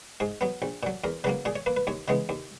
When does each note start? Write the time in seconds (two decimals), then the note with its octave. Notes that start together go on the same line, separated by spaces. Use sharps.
0.20 G#2 G#4
0.41 F#3 B3
0.62 A#1
0.83 A#2 F#3
1.04 E2 A#4
1.24 C#3 F#3 A#3 B4
1.45 A#2 G#4
1.56 C#5
1.66 A#3 B4
1.77 B4
1.87 D#2 C#5
2.08 C#3 E3 G#3 B3
2.29 D#2